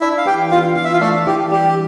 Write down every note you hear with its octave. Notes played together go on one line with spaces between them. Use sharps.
D4 E4 E5
F5
E3 G4 G5
B3 F4 F5
E3 F5
E5
F4 F5
A3 D4 A4
E3 G4
G3 G4